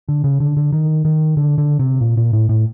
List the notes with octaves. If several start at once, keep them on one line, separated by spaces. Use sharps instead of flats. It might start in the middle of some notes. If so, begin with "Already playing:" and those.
D3
C#3
D3
D3
D#3
D#3
D3
D3
C3
A#2
A#2
A2
A2